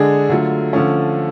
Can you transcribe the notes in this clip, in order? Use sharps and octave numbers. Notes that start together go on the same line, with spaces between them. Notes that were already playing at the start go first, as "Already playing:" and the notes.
Already playing: D3 G#3 D4 G#4
D3 F#3 A3 F4
D3 F3 A3 C#4